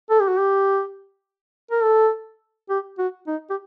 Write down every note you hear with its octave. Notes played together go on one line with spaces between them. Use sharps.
A4
G4
F#4
G4
A#4
A4
G4
F#4
D#4
G4